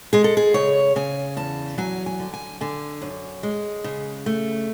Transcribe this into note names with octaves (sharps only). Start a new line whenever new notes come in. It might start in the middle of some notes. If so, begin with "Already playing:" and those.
G#3 G#4
A4
G#4
C#3 C#5
C#3 G#5
E2 A5
F#3 G#5
G#5
D3
G#5
D3 G#5
F#2
G#3
C#3
A3